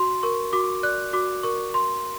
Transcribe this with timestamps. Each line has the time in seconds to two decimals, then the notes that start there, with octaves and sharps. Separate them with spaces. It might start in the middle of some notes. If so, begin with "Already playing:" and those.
Already playing: F#4 C6
0.23 A#4 C#6
0.53 F#4 D6
0.83 D5 F#6
1.13 F#4 D6
1.43 A#4 C#6
1.74 F#4 C6